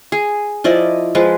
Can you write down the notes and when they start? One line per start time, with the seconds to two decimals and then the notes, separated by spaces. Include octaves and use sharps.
0.12 G#4
0.64 F3 E4 D5 D#5
1.15 F3 G#3 B4